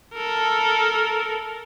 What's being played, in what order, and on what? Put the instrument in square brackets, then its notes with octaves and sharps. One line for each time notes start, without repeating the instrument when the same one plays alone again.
[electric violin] A4 A#4